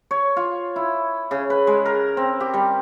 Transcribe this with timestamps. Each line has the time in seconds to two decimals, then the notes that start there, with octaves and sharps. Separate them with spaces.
0.11 C#5
0.37 F4
0.76 E4
1.31 C#3
1.50 B4
1.67 G#3
1.86 A#4
2.17 C4
2.40 G4
2.54 G3